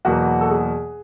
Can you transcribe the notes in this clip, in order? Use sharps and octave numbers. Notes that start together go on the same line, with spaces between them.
E2 B2 F#3 A#3 F#4
A4
G#4